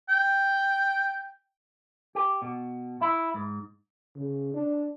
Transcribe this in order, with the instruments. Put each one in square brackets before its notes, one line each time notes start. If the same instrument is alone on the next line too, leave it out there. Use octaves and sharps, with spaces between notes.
[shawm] G5
[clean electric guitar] G4
B2
E4
G#2
[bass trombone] C#3
D4